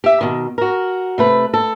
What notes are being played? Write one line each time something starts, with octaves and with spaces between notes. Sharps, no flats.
G4 E5
B2 D#3
F#4 A#4
C3 A3 B4
A4